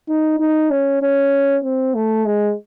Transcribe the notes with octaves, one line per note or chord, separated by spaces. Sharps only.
D#4
D#4
C#4
C#4
C4
A3
G#3